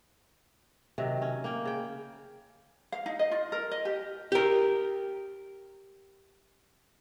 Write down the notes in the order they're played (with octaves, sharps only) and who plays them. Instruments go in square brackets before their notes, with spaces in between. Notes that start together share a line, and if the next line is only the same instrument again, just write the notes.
[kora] C3 D#3 F#3
C#4
A#3 G5
C#3 G5
[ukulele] F5
D#4
D#5
F4
A#4
D#5
G4
[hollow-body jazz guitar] G4 A#4